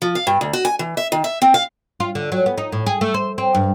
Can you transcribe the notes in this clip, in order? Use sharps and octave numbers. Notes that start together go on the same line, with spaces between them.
F3
F5
G2
D2
F#4
G#5
E3
E5
D#3
E5
C4
F5
F4
D3
F#3
B3
D#4
A2
G#4
A3
C5
C4
G2